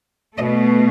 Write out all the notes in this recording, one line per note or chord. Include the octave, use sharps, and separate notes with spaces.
B2 A3 D#5